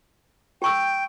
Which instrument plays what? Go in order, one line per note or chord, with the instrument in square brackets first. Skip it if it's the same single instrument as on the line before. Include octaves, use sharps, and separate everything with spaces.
[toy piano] G4 C#6 E6 [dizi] G5